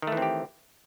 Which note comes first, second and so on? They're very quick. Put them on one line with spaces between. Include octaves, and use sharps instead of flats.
D#3 A3 E3 C4 G4